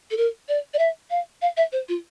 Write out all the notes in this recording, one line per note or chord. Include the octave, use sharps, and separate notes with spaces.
A4
A#4
D5
D5
E5
F5
F5
E5
C5
F4